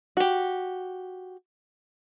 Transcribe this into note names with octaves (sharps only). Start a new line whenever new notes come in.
F#4 G4